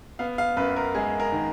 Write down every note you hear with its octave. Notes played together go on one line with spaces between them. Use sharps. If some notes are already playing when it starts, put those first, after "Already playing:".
B3 F5
F5
F#2 B4
A#4
G#3 G#4
A#4
D#3